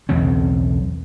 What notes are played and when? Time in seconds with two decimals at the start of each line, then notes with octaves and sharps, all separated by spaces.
0.09 B1 E2 C#3 C4